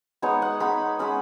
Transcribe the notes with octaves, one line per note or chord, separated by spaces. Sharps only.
G#3 B3 D#4 C#5
F#5
G#3 B3 D#4 B5
G#3 C#4 B5